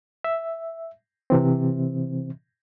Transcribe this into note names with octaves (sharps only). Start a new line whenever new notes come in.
E5
C3 E3 C4